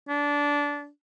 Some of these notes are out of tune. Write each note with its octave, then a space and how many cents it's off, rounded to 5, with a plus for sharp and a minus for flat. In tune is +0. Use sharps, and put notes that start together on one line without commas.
D4 -20